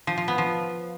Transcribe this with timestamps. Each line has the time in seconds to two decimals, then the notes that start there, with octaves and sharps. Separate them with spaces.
0.07 F3
0.18 F3
0.28 B3
0.38 F3